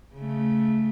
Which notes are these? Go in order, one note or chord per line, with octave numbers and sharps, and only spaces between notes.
C#3 A3